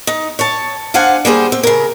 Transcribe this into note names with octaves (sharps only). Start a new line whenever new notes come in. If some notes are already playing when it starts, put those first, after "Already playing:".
D#4
C#5 A5
D4 C5 F5 F#5 G#5
G3 A#3 G#4 C5
C4
C#3 A#4